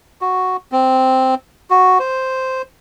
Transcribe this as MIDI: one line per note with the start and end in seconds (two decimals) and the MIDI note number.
0.21 0.57 66
0.72 1.35 60
1.70 1.99 66
2.00 2.62 72